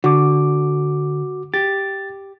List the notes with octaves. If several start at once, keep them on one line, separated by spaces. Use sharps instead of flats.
D3 F#4 D6
G4 A6